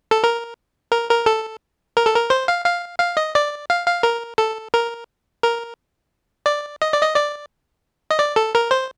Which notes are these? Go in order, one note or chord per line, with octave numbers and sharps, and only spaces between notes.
A4
A#4
A#4
A#4
A4
A#4
A4
A#4
C5
F5
F5
F5
D#5
D5
F5
F5
A#4
A4
A#4
A#4
D5
D#5
D5
D#5
D5
D#5
D5
A4
A#4
C5